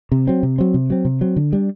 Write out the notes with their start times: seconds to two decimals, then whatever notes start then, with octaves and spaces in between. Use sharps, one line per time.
0.12 C3
0.27 F#3 C4
0.43 C3
0.58 F#3 C4
0.74 C3
0.90 F#3 C4
1.05 C3
1.21 F#3 C4
1.36 D3
1.53 G3 D4